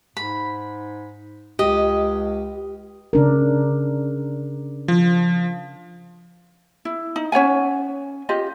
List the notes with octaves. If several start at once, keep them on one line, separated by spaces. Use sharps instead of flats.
G#2 B5
C#2 G4 D#5
C#3 D4 A#4
F3
E4
D#4
C#4 C#5 F#5 G#5
F4 G4 D#5